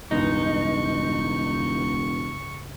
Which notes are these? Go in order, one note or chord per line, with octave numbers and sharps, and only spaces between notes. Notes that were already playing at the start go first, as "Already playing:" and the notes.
E1 C#2 G2 D#4 C#6